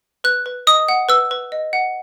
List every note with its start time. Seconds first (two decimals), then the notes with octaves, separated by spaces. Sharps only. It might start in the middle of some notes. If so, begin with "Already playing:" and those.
0.24 B4 F#6
0.46 B4
0.67 D#5 D#6
0.89 F#5
1.09 B4 E6
1.31 B4
1.52 D#5
1.73 F#5